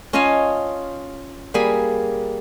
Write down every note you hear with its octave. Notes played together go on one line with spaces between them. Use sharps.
C#4 F4 D#5 F5 G#5 A5
G3 A#3 G#4 G#5 B5